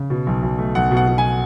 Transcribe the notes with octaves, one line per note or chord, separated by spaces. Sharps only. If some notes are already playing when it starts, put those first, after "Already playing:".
Already playing: C#3
B2
B1
B1
A3
B1 F#5
B2
F#5
B2
G#5